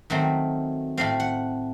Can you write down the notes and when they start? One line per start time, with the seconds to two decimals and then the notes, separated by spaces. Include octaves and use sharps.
0.10 D#3 F#3 A3 C4
0.97 A2 A3 C4 F5
1.20 F#5